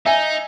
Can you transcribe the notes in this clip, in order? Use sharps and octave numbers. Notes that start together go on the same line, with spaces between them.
D#4 E5 G#5